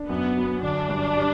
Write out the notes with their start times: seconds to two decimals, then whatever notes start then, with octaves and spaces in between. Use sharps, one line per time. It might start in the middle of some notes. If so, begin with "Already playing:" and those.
Already playing: D4
0.09 F#2 B3
0.37 F#3
0.63 D3 D4
0.89 G2
1.17 G3